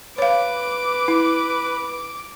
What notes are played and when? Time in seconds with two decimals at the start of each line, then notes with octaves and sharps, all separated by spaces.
0.18 B4 C#5 F5 D6
1.08 E4